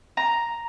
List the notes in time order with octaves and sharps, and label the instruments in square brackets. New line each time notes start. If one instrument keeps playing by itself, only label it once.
[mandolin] A#5